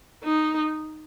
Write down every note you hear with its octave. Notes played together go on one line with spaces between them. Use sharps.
D#4